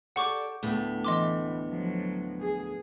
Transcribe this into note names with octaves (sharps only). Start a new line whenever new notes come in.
G4 A4 D5 F#5 C#6 D6
D2 A2 B3
E3 D#5 C6 D6
F3 F#3
G#4